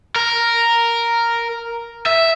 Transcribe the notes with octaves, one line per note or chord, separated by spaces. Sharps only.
A#4
E5